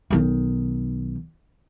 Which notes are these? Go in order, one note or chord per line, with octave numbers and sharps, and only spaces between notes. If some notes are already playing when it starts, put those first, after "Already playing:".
B1 D#3